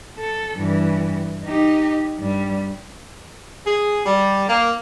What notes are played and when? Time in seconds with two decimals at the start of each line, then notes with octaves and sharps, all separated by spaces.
0.19 A4
0.56 G2 E3
1.44 D#4 G4
2.18 G2 G3
3.66 G#4
4.06 G3
4.49 A#3